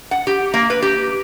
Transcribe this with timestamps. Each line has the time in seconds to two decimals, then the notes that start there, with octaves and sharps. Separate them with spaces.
0.11 F#5
0.27 G4
0.54 A#3
0.70 B4
0.82 G4